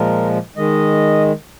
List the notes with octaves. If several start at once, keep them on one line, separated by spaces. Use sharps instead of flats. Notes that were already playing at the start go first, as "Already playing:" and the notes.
Already playing: A#2 F3 G#3 A#4
D#3 G#3 D#5